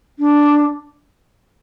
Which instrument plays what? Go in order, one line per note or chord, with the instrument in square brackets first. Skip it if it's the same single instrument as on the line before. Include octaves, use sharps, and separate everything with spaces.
[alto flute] D4